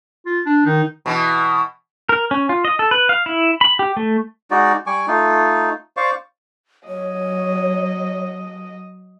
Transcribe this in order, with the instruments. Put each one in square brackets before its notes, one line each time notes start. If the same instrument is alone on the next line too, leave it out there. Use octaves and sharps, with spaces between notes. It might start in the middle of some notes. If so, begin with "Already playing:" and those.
[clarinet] F4
D4
[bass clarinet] D#3 [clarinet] D#4
[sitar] B2 E3
[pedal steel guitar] A#4
C#4
F4
D#5
A4
B4
F5
E4
B5
G4
A3
[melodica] G#3 D#4 F#4 D5
G3 G#5 C#6 D6
A3 D#4 F4
C5 D5 F5 C#6
[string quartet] F#3 [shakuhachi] C#5 [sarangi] D#5